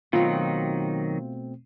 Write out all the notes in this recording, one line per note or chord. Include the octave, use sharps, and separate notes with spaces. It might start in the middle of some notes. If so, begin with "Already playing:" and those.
B2 D#3 F#3 A3 C4 D#4 F4